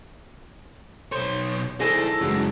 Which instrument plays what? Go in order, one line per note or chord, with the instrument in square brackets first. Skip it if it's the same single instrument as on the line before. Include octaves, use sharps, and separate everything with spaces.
[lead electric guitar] B1 C#5 [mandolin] C5
[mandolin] D#4 A4 [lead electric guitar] E4 C5 [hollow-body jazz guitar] G#4 D5 G#5
[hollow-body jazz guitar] F#2 F#3 G#3 [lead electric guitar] C#3 E3